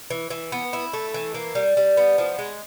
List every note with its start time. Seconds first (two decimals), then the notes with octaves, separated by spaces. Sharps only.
0.11 E3
0.30 E3
0.52 B3
0.73 E4
0.93 A3
1.14 E3
1.34 A#3
1.55 G3
1.77 G3
1.97 B3
2.18 F3
2.39 G#3